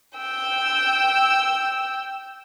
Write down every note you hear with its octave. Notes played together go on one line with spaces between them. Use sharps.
G5 E6